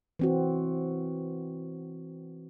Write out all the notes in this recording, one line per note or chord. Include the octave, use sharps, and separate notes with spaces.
E3 C4 F#4